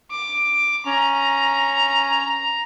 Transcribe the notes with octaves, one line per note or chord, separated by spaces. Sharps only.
D6
C#4 A#5